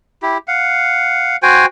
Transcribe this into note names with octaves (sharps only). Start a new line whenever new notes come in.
E4 G4
F5 F#5
F#4 C5 G5 G#5